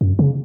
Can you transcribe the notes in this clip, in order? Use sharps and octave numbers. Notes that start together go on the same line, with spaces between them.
F#2
C#3